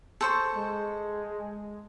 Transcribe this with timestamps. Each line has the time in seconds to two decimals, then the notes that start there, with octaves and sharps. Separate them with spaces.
0.21 A4 C5 C#6
0.56 G#3